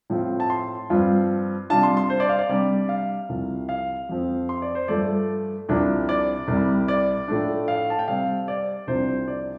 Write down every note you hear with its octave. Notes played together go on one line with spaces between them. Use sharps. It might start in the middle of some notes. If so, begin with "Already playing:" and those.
A2 F3 C4 F4
A5
C6
G2 F3 C4 F4
C3 G3 D4 F4 A5
C6
C6
C5
D5
F5
D5
C3 G3 D4 D5
F5
C2 C3 F3
F5
F2 F3 C4
C6
D5
C5
G2 F3 A3 D5
C2 C3 F3 D4
D5
C2 C3 G3
D5
A2 F3 A3 D4
F5
A5
G5
C3 G3 C4 F5
D5
C2 C3 F3 D4 C5
D5